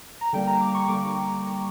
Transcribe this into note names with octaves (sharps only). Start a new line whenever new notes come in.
A#5
D3 G3 A#3 G5
A#5
D6
C#6
D3 G3 A#3 D6